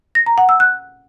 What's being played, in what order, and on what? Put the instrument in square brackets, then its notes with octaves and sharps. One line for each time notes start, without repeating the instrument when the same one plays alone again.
[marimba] A#6
A#5
F#5
E6
F#6